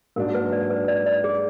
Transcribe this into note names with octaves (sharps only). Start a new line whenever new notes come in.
G#2 F#3 A#3 D4 A#4
B4
D5
B4
D5
D5
G#4